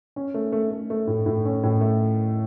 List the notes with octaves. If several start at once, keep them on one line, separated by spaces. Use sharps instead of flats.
C#4
A3
A3
A3
A3
A2
A2
C#4
A2
A3